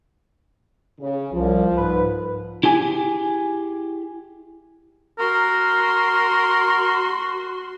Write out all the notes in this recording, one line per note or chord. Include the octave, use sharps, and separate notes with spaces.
C#3
C2 F3
G#2 B4
E4 G4 G#4 G#5
F#4 A#4 C6